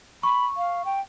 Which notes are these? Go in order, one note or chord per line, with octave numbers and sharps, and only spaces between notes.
B5 C#6
F5
G5